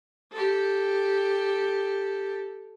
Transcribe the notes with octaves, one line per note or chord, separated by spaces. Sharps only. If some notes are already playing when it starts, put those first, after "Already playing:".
G4 A4